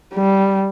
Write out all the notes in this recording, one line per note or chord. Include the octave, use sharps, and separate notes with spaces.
G3